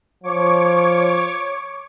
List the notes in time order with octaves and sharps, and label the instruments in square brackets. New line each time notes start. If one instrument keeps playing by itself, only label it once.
[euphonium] F3 [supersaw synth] C#5 C#6 D6